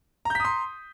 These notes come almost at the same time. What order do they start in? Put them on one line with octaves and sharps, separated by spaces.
A#5 G6 B6 D#6 C6